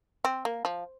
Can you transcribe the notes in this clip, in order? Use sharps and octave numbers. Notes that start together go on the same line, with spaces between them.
C4
A#3
F3